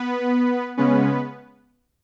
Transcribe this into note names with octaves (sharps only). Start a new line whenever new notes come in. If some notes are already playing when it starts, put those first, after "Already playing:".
Already playing: B3 B4
C#3 G#3 B3 C#4 B4